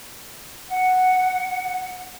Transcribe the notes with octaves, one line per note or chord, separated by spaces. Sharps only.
F#5